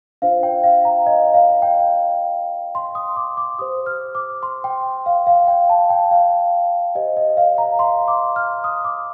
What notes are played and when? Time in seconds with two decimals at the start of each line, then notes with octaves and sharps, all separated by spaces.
0.22 D4 F4 C5 F5
0.43 G5
0.64 F5
0.85 A#5
1.06 D#5
1.34 F5
1.62 G5
2.75 C6
2.95 D#6
3.17 D6
3.37 D6
3.59 G4 C5 D#6
3.86 F6
4.15 D6
4.43 C6
4.64 G5
5.06 F5
5.27 F5
5.48 G5
5.70 A5
5.90 G5
6.11 F5
6.95 G4 C5 D#5
7.17 D#5
7.37 F5
7.58 A#5
7.79 C6
8.08 D6
8.36 F6
8.64 D#6
8.85 D6